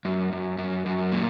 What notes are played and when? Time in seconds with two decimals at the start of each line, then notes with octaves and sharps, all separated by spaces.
0.05 F#2
0.33 F#2
0.58 F#2
0.86 F#2
1.12 A#2